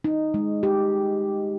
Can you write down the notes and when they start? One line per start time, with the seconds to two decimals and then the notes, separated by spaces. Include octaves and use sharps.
0.04 D#4
0.34 G#3
0.63 G4